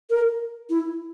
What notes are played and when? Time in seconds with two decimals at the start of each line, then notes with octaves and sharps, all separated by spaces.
0.10 A#4
0.69 E4